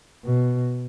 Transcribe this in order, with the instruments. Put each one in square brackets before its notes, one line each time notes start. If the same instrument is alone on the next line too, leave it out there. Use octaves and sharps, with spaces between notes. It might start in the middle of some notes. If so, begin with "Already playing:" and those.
[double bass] B2